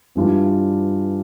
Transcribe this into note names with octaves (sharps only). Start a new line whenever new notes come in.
G2 E3 G3 D4 F4